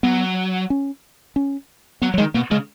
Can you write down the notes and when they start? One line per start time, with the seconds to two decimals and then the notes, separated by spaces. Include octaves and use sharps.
0.03 F#3 B3
0.70 C#4
1.36 C#4
2.02 F#3 B3
2.14 F#3
2.18 D#3 G#3
2.34 B2 A#3
2.51 C#3 G#3